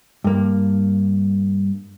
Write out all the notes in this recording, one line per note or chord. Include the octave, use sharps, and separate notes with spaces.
G2 A#3